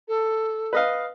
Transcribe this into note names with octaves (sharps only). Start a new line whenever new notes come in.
A4
B4 D#5 F5